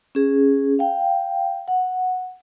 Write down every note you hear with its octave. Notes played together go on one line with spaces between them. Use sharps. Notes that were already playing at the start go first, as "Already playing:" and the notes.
C#4 G#4
F5 G5
F#5